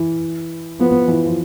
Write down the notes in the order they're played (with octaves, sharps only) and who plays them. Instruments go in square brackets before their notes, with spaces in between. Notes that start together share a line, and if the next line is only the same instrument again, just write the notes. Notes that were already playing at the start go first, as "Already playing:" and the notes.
Already playing: [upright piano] E3
[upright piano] F3 [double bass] B3
[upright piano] E3
F3